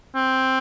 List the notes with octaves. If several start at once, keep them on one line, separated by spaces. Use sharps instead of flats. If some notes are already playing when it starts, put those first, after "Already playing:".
C4